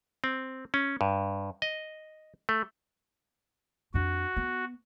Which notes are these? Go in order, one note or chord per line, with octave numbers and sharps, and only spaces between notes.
C4
C#4
G2
D#5
A3
F2 D4 F#4
B3